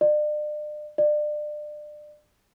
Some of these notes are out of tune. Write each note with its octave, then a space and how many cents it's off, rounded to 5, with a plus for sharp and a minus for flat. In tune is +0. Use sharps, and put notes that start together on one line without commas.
D5 +40
D5 +30